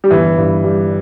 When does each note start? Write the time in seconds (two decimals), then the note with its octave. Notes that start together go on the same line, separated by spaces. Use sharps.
0.04 G3
0.11 G1 E3
0.37 G2
0.64 G3